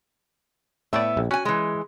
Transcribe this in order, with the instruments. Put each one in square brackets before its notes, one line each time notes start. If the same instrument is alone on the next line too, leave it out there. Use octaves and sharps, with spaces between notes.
[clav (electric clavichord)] A2 A3 D5 [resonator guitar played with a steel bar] B3 E4 E5
[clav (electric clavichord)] A#1
[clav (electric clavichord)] C#4 [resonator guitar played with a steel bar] F#4 G#5
[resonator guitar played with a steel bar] E3 G#3